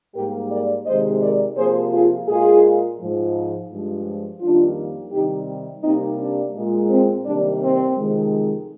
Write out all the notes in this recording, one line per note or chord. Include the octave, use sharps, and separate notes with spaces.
G#2 G3 A#3 G4 A#4
A#4 D5
C3 D#3 G#3 C5 D#5
A#4 D5
C3 F3 A#3 G#4 C5
F4 G#4
A#2 G#3 F4 G#4
G#2 F3 G#3
G2 F3 G#3
F2 D#3 G3 A#3 D4 F4
C3 D#3 G3 D#4 G4
C3 G3 A#3 C4 D#4
D4
A#2 G#3
C4
C3 D#3 G3 A#3 D4
C4
F2 C3 D#3 G#3